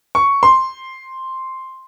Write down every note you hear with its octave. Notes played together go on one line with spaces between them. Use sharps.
C#6
C6